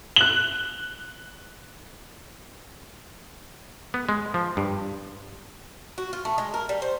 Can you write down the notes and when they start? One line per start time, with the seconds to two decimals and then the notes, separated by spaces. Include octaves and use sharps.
0.16 F#6 F#7
3.94 B3
4.09 G#3
4.34 F3
4.57 G2
5.98 F#4
6.13 F4
6.25 A3
6.38 G#3
6.54 A#4
6.69 G3
6.82 C5